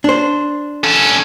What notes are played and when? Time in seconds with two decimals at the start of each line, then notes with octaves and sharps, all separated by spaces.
0.04 D4 C5
0.84 C#4 A4